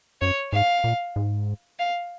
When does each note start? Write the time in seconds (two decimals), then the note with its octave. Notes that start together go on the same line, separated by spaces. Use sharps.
0.21 F#2 C#5
0.53 G#2 F5
0.84 A#2
1.16 G#2
1.79 F5